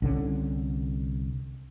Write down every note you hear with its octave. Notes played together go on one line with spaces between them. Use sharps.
C2 D3 C#4